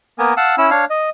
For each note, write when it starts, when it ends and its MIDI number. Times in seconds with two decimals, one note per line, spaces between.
0.19 0.34 58
0.19 0.34 59
0.19 0.34 70
0.19 0.34 80
0.37 0.55 77
0.37 0.55 78
0.37 0.55 81
0.37 0.55 88
0.58 0.70 61
0.58 0.70 64
0.58 0.70 88
0.70 0.85 62
0.70 0.85 73
0.70 0.85 77
0.90 1.10 75